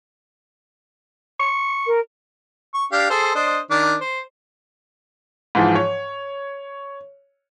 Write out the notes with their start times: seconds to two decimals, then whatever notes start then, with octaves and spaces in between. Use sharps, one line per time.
1.40 C#6
1.87 A#4
2.74 C#6
2.92 D4 G4 F5
3.10 G#4 A4 C5
3.35 D4 C5 D#5
3.71 D#3 D4 D6
4.01 C5
5.55 G#2 E3 F3
5.75 C#5